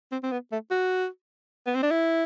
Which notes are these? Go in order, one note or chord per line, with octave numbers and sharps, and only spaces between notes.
C4
C4
B3
A3
F#4
B3
C4
D4
E4